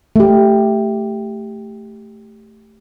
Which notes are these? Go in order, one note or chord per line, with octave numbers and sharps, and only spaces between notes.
A3 G4